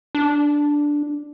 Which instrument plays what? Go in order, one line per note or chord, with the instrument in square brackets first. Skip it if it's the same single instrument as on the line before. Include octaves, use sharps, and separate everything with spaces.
[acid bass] D4